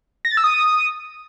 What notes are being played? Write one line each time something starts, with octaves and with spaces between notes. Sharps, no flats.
A#6
A6
E6
D#6